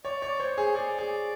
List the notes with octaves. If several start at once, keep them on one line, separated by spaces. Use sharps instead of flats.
C#5 D5
C#5
D5
C5 C#5
G#4
G#4 D5
G#4